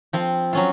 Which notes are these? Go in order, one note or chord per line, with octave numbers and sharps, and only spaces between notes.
F3 C4 F4
F#3 C#4 F4